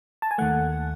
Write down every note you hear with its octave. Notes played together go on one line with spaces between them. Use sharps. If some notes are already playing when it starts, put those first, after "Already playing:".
A5
G#5
D#2 D#3 A3 F#5